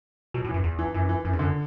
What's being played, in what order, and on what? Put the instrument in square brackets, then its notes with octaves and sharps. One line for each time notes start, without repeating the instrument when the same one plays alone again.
[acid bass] B2 [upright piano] F#3
[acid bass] A2
[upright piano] E3
[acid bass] F#2
E2
[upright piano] E3
[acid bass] F#2 [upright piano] E3
[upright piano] E3
[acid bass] F#2 [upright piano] E3
[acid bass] E2
[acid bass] F#2 [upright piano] D3